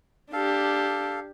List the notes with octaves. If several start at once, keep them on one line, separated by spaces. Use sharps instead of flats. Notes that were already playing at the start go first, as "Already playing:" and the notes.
D4 G4 A4 F5